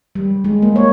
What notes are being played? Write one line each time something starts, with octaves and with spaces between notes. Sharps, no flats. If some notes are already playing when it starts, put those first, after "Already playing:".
G3
G#3
A#3
C#5